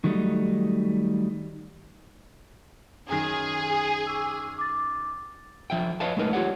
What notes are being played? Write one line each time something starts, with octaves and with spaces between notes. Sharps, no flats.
D#3 F#3 G3 A3 C#4 D#4
F#2 D#3 G#4
C#6 D6 E6
D6 A6
F3 E5 G5
B4 C#5 D#5 F5 G#5 A5
G#3 A3 D#4 A#4 B4
F4 G4 C#5 F#5